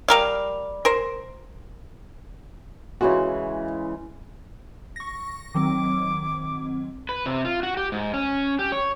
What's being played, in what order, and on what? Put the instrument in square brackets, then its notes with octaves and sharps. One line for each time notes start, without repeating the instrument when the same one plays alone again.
[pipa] G3 A#4 F5
A#4 C5
[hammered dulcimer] C#3 E3 G#3 [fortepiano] F#4
[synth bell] C#6 A#6
[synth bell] D#3 F#3 C4 [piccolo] D6
[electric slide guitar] B4
C3
F4
F#4
G4
G#2
C#4
G4
C#5